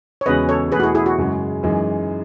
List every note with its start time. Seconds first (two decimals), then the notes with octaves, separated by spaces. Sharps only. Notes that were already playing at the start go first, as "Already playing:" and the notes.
0.21 C#5
0.26 E2 C#3 G#3 C#4 F#4 B4 D#5
0.49 A4 C#5
0.72 E2 B2 A3 G#4 B4
0.80 F#4
0.83 E4 G#4
0.95 E4 G#4
1.06 F#4
1.18 F#2 C#3 G#3
1.63 F#2 E3 G#3 D#4